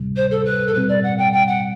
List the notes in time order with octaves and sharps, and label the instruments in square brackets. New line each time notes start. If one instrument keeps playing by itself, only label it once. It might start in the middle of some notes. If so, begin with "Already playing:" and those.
Already playing: [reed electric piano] D2 C3 G3
[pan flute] C5
A4
B4
A4
[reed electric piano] B2 G3 C4 [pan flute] B4
[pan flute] D5
F#5
G5
G5
F#5